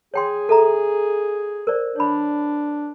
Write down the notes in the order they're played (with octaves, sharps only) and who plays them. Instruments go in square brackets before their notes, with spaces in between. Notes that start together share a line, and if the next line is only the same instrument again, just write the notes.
[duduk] G#4 [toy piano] C#5 G5 C6
[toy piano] A4 E5 A#5
A#4 C5 D5
[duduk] D4 [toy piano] C#5 B5